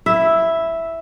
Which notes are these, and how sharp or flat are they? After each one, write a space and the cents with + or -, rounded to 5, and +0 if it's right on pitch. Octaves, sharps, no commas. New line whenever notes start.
E4 +0 E5 +0